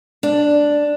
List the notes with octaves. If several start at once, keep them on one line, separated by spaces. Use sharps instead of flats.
D4